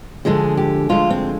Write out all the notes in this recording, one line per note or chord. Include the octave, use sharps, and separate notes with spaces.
D2 D3 F3 G#3 G#4
G4
D2 D3 F3 G#3 F4
C4